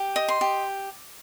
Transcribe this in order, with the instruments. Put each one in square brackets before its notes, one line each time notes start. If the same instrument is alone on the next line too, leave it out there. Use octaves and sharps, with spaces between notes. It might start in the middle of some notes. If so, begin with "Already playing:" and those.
Already playing: [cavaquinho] G4
D#5
C6
G4